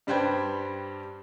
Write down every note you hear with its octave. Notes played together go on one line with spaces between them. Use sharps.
G2 G3 B4 C5 G5 G#6